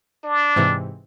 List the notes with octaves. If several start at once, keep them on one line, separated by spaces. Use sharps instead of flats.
D4
G#2 C3 E3